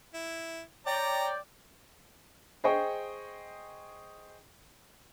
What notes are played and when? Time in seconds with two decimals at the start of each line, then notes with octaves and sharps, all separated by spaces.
0.14 E4
0.87 C#5 D5 G5 A#5
2.64 G#4 C5 D#5 G5 C#6